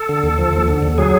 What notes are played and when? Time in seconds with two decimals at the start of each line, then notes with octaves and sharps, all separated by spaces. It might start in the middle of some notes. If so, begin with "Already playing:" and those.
Already playing: A4
0.09 D3
0.23 D#2
0.38 F3
0.53 D#2
0.68 D3
0.83 D#2
0.98 F#3 G#4